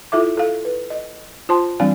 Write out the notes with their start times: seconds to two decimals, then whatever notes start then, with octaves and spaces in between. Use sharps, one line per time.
0.12 E4 F4 A4 E5 D6
0.37 A4 F5
0.65 B4
0.90 D#5
1.49 F4 C5 A5 C6
1.80 E3 G3 C4 D4 F5 G#5